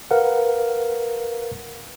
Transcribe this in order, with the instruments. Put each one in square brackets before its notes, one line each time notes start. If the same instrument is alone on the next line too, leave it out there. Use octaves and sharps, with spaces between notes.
[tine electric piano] A#4 B4 F5 F#5